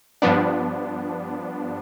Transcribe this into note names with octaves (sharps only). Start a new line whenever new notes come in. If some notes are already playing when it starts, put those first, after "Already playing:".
G2 F3 B3 D4